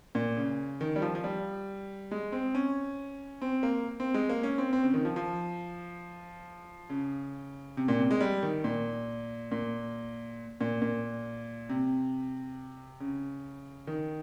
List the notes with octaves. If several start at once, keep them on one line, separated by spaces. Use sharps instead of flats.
A#2
C#3
D#3
G3
F3
F3
G3
G#3
C4
C#4
C4
A#3
C4
G#3
A#3
C#4
C4
C4
C#3
D#3
F3
F3
C#3
C3
A#2
C3
G#3
G3
D#3
A#2
A#2
A#2
A#2
C3
C#3
D#3